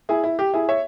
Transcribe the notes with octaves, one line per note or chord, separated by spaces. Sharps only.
E4 G#4
E4
G4
E4 G#4
C#5 E5